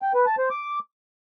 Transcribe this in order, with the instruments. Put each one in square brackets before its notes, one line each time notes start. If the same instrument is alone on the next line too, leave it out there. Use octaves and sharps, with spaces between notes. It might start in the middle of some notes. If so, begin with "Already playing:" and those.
[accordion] G5
B4
A5
C5
D6